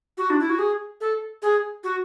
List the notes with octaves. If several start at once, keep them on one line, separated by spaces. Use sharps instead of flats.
F#4
D4
E4
F#4
G#4
A4
G#4
F#4